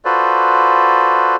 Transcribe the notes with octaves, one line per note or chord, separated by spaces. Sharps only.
F4 F#4 A4 B4 C5 D5